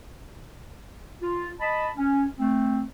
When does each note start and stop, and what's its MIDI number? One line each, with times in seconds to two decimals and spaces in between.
1.22 1.50 65
1.60 1.87 75
1.60 1.87 81
1.60 1.87 83
1.97 2.25 61
2.39 2.82 57
2.39 2.82 60